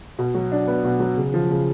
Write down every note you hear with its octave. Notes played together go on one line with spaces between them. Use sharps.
B2
F#3
D4
B3
B2
F#3
C#3
F3
C#3